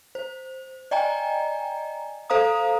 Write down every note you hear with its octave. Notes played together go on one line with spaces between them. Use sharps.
C5
D5 D#5 G5 G#5 A#5
A4 C5 F5 A#5 D#6